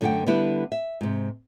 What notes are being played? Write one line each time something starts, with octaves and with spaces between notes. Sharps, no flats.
F#2 D3 A3 G4 F#5 G5
D3 G3 B3 E4 G4 B4
E5
G#2 C3